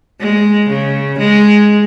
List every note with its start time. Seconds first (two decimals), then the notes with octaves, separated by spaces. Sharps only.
0.20 G#3
0.69 C#3
1.19 G#3